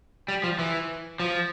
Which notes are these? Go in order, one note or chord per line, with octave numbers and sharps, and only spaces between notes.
G3
F3
E3
F3